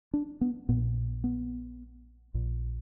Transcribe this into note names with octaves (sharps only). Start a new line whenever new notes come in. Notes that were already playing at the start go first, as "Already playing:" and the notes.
D4
B3
A#1 A#2 B3
B3
A#1 A#2